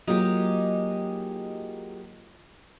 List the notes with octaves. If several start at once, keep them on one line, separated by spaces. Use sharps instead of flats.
F#3 G#3 A#3 D#4 F4 G4